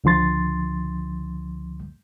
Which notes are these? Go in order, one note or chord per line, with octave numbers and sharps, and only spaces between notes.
C#2 D3 F3 C6 A6